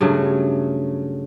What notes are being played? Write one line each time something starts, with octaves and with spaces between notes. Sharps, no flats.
G2 C#3 F#3 A3